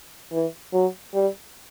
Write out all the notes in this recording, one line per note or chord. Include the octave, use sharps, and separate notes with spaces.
E3
F#3
G3